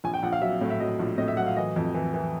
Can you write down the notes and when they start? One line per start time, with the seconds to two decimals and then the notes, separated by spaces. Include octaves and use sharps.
0.04 A#1 G#5
0.14 G5
0.23 A#1 F#5
0.32 F5
0.42 F#3 E5
0.61 A2
0.70 E5
0.80 F#3 D#5
0.99 A#1
1.18 A2 D#5
1.28 E5
1.37 F#3 F#5
1.47 F5
1.56 E3 D#5
1.76 F2
1.94 E3
2.14 E3